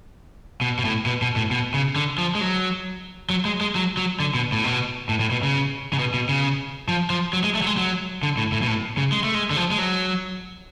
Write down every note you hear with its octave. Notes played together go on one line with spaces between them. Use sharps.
B2
B2
A2
B2
B2
A2
B2
C#3
D3
F3
G#3
F#3
F#3
G#3
G#3
F#3
F#3
D3
B2
A2
B2
A2
A2
B2
C#3
C#3
B2
B2
C#3
F3
F3
F#3
G#3
A3
F#3
G#3
F#3
D3
A2
A2
B2
A2
C#3
G#3
A3
G#3
D3
F3
G#3
F#3